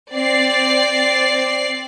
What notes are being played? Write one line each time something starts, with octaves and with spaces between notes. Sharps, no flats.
C4 D5 C7